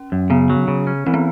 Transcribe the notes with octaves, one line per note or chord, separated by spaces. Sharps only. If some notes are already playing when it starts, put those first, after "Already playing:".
Already playing: C#4
F#2
C#3 B3
F#3
C#3
C#4
E3 C4
B3